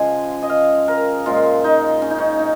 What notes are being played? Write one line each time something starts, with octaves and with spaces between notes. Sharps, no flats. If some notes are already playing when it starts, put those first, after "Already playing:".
Already playing: C#3 F3 G#3 G#5
D#5
F5
A#4
A#2 F3 G#3 F4
D#4
C#4
D#4
C#4
D#4